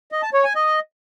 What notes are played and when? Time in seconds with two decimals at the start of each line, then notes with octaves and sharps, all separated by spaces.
0.12 D#5
0.23 A5
0.34 C#5
0.44 G#5
0.55 D#5